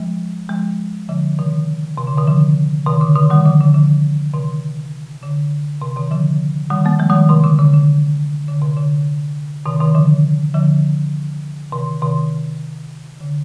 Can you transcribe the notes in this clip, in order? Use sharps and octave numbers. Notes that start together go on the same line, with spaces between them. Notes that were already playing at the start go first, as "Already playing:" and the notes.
Already playing: F3 G#3
F3 G#3
D3 F3
C3 D#3
C3
D3
C3 D#3
D3 F3
C3 D#3
D3
C3 D#3
D#3 G3
D3 F3
D3
D3 F3
C3 D#3
D3
C3
C3 D#3
D3 F3
D#3 G3
G3 A#3
F3 G#3
D#3 G3
C3 D#3
D3
D3
D3
D3
C3
D3
C3 D#3
C3 D#3
D3 F3
D3 F3
C3 D#3
C3 D#3
D3